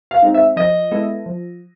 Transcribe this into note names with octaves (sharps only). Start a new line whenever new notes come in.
F5
G#3 C4 D#4
E5
F3 D#5
G#3 B3 E4 A4
F3